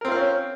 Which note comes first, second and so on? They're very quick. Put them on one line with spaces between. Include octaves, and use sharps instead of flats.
A#4 C4 F4 F5 C#4